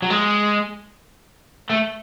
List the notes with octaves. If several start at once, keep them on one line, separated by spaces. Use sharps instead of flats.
F#3
G#3
A3